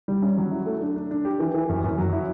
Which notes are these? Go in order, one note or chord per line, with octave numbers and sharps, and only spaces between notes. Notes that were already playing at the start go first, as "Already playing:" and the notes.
G3
C#4
F#3
E4
A3
D4
D4
D4
G4
E3
E3
F#2
F#2
F#3
E4